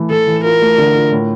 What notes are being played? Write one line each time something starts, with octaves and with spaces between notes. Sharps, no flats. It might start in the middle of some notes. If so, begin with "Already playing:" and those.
Already playing: E3 A3
E3 A4
E3
F4 A#4
A3
D3
F4
A2